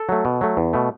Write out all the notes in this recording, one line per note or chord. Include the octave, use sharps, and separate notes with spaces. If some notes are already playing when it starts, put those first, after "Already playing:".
Already playing: A4
F#3 A3
B2
F#3 A3
E2
B2 A3